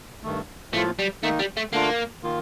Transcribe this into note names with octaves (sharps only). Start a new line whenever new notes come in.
G2 D#3 A3
A2 F3 A3 A#3 F4
G3
D#3 A3 A#3 D#4
G3
A3
D3 A3 A#3 D4 F4
D#3 A#3 F4